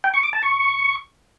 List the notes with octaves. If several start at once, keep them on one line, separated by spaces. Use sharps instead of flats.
G5
C#6
D6
A5
C#6